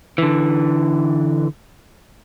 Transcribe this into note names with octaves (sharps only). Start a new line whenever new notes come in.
D3 E3